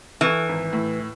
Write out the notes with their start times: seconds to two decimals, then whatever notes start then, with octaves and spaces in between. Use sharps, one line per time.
0.21 E3 A4 C#6 F6
0.49 G#1
0.73 A2